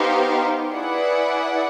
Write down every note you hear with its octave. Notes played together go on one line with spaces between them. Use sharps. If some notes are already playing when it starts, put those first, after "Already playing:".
Already playing: B3 D#4 G4 C5 F5
E4 G#4 B4 D5 F#5